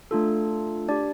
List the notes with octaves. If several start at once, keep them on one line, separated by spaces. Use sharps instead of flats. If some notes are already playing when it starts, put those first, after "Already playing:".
A3 D4 F4 A4
D4 G4 D5